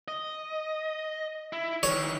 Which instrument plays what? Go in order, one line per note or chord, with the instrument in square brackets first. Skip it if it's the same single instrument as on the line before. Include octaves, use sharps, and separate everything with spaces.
[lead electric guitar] D#5
E4
[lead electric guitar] D#3 E3 [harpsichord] C#5